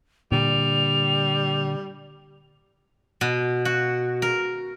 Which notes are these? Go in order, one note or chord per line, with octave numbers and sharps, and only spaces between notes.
A#2 D3 G3 F7
B2
F#4
A#4